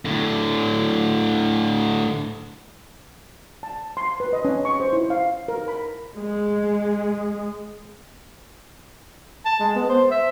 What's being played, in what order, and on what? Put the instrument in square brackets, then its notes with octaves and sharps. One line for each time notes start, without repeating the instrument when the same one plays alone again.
[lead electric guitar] A2 D3
[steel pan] A5
C6
B4
D#5
C#4
C#6
C5
E4
F5
A#4
B5
[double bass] G#3
[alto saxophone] A5
G#3
B3
C5
E5